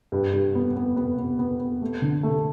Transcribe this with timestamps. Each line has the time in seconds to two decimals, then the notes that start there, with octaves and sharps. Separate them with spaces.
0.12 G2
0.33 G2
0.55 B3
0.76 B3
0.96 B3
1.18 B3
1.39 B3
1.60 B3
1.82 A3
2.02 D3
2.23 A3